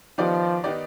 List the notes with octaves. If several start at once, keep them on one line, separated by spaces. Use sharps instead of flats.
D#3 F3 B3 D#4 G4 D5
D#3 B3 D#4 G4 D5